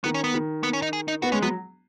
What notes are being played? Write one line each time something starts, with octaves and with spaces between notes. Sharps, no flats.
D#3 B3
C#4
B3
D#3
B3
C#4
D#4
G#4
D#4
B3 F#4
G#3 C#4
F#3 B3